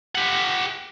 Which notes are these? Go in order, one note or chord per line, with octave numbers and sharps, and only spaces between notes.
G4 F#5